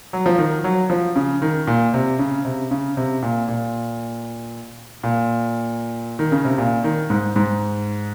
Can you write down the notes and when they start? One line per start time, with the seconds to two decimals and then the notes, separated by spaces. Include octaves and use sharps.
0.13 F#3
0.26 F3
0.38 D#3
0.64 F#3
0.90 F3
1.16 C#3
1.42 D#3
1.67 A#2
1.94 C3
2.19 C#3
2.45 C3
2.71 C#3
2.97 C3
3.23 A#2
3.48 A#2
5.03 A#2
6.19 D#3
6.32 C#3
6.45 C3
6.58 A#2
6.84 D#3
7.10 G#2
7.36 G#2